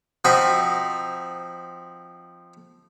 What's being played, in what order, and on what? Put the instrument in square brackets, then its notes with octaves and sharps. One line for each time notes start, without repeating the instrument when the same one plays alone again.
[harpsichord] F3 C4 D#4 F#4 F#5 B5